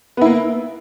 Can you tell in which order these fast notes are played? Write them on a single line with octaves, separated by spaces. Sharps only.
B3 E4 A#3